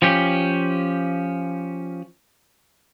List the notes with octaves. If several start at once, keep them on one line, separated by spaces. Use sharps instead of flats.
F3 C#4 G4